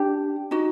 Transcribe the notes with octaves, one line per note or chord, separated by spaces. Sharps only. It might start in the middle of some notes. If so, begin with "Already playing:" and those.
Already playing: D4 G4
D#4 F#4